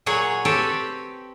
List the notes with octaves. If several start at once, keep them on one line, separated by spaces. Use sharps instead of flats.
A#2 F#3 G#4 C#5 F#5
C4 G4 A4 B4 C#5